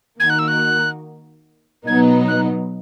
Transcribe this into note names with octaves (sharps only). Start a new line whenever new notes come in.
D#3 A#3 D#4 F#4 A#4 G#6
F#6
E6
F#6
B2 F#3 B3 D#4 G#6
F#6